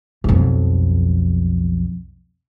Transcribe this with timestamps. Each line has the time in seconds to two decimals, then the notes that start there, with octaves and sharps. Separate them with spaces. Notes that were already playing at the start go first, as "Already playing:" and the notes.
0.24 B1 F2